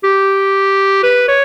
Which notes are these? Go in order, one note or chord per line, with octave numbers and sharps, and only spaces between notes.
G4
B4
C#5